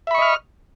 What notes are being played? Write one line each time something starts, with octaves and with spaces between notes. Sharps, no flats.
D#5 E5 B5 C#6 F6